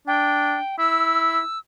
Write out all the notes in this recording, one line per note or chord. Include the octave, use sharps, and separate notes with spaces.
D4 G5
E4 E6